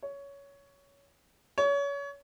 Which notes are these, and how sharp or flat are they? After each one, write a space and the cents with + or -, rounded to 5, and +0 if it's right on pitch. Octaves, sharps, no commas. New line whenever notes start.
C#5 +15
C#5 +30